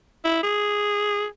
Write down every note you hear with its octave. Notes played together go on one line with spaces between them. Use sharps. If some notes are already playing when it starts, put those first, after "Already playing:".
E4
G#4